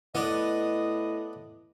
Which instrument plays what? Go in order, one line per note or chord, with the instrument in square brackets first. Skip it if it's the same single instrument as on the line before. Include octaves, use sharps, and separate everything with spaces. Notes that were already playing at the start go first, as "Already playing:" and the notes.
[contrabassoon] A2 [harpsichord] B3 D4 [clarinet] D#5